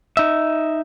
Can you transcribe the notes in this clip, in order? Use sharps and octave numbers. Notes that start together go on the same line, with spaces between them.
D#4 E5